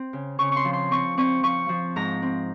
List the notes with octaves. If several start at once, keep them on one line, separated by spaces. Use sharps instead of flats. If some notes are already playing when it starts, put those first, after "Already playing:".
Already playing: C4
C#3
C#3 C#6
C6 C#6
F3
C6
C4 C#6
C4 C#6
F3 C#6
F3
G#2 A#5
C4